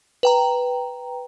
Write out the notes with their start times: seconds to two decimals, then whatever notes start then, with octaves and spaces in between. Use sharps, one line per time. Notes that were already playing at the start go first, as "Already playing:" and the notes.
0.23 B4 G5 A#5